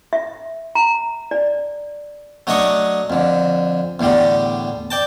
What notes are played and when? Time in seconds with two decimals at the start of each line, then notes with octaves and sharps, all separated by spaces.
0.13 E5
0.75 A#5
1.31 D5
2.47 F#3 A3 D4 D#5 C#6
3.10 F2 D3
4.00 E2 A2 D3 G3
4.91 D5 G5 A5